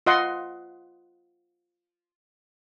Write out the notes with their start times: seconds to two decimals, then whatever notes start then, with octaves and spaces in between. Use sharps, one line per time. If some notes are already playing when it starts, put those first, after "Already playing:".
0.06 F4 D#5 F#5 C6